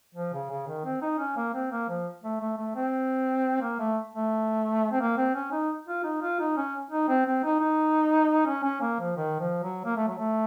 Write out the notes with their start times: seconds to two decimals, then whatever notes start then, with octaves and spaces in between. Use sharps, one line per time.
0.15 F3
0.33 C#3
0.50 C#3
0.67 D#3
0.84 C4
1.02 D#4
1.18 C#4
1.36 A#3
1.54 C4
1.71 A#3
1.88 F3
2.23 A3
2.41 A3
2.57 A3
2.75 C4
3.62 A#3
3.79 A3
4.14 A3
4.91 C4
5.00 A#3
5.17 C4
5.35 C#4
5.52 D#4
5.87 F4
6.04 D#4
6.22 F4
6.40 D#4
6.57 C#4
6.91 D#4
7.08 C4
7.26 C4
7.44 D#4
7.60 D#4
8.46 C#4
8.64 C#4
8.81 A#3
8.99 F3
9.17 D#3
9.39 F3
9.63 F#3
9.85 A#3
9.96 A3
10.08 F#3
10.18 A3